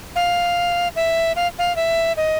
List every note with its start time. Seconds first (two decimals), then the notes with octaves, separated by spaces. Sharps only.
0.16 F5
0.96 E5
1.36 F5
1.59 F5
1.76 E5
2.17 D#5